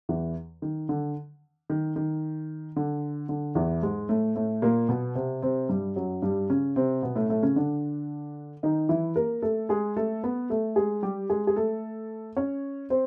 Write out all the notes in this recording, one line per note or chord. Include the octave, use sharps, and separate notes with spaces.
E2 E3
D#3
D3
D#3
D#3
D3
D3
E2 E3
G#2 G#3
A2 A3
A2 A3
A#2 A#3
B2 B3
C3 C4
C3 C4
G2 G3
F#2 F#3
G2 G3
C#3 C#4
C3 C4
B2 B3
A2 A3
A2 A3
C#3 C#4
D3 D4
D#3 D#4
E3 E4
A#3 A#4
A3 A4
G#3 G#4
A3 A4
B3 B4
A3 A4
G#3 G#4
G3 G4
G#3 G#4
G#4
A3 A4
C#4 C#5
C4 C5